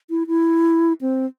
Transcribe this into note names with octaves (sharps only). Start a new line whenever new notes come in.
E4
E4
C4